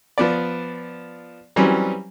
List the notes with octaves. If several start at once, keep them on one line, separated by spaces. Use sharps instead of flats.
F3 B3 D5
E3 F#3 G3 C4 C#4